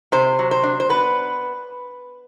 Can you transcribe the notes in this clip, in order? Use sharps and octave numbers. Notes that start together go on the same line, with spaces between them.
C3 C5
F#3
C5
D4
C5
B3 B4